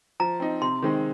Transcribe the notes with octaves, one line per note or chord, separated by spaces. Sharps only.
F3 A#5
C4 D#4
C3 C6
D#3 G#3 C4 D#4